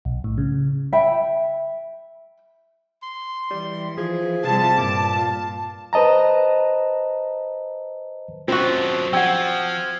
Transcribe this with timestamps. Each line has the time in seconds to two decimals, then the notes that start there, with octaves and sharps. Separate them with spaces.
0.05 B1
0.24 A2
0.38 C#3
0.93 E5 G5 B5
3.03 C6
3.51 E3 G3
3.98 F3 G#4
4.44 C3 F3 G3 A5
4.78 G2 A#2 D6
5.15 F4
5.93 B4 C5 D#5 A5 A#5
8.48 F#2 F3 C4 F4 F#4
9.13 F3 F#5 G5 E6 G#6